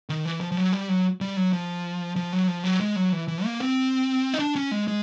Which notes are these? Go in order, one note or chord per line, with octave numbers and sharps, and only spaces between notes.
D#3
E3
F3
F3
F#3
G3
F#3
G3
F#3
F3
F3
F#3
F3
F#3
G#3
F#3
E3
E3
A#3
C4
D#4
D4
C#4
G#3
G#3